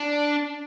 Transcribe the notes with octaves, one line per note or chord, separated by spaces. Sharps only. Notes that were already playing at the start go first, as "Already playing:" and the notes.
Already playing: D4